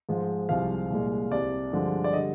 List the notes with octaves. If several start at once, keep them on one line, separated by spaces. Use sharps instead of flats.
G#2 F3 G#3
C2 C3 F3 G#3 F5
C2 A#2 G#3
C2 C3 G3 D5
G2 D3 F3 G#3
D5
D3 G3 D#5